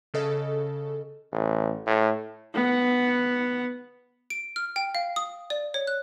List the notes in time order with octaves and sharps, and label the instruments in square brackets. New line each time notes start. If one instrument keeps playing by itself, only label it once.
[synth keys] C#3 A4 D#5
[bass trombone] A1
A2
[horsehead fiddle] B3 F#5
[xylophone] D7
F6
G5
F5
D#6
D5
C#5
F#6